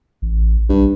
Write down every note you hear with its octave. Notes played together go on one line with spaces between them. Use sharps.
A1
B1 G2